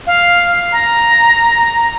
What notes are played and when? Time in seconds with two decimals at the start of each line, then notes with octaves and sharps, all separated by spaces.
0.07 F5
0.72 A#5